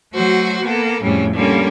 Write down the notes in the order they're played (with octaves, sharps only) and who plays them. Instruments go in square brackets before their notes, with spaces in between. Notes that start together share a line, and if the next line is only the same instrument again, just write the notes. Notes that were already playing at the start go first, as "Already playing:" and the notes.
[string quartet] F#3 A3 F#4 C5
A#3 B3 A4
F2 A2 C#3 G3 A3
D3 G3 A#3 C#4